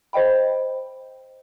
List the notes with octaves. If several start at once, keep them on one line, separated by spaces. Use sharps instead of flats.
C5 D#5 G5 B5